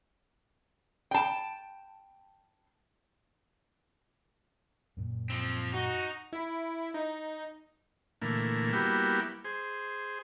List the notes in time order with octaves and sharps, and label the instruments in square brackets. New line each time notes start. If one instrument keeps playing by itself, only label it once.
[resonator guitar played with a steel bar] G5 A5
[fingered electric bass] F#2 A#2
[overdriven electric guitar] F3 C4
[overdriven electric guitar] D#4 [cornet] F#4
[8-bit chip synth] E4
D#4
[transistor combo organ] A#2 D3 E3 A3 A#3
G3 A#3 B3 E4 F#4 G4
G#4 C5